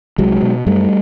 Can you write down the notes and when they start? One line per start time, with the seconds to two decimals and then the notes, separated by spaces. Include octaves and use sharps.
0.18 C2 F#3 G#3
0.42 B2
0.66 F#2 G3 A3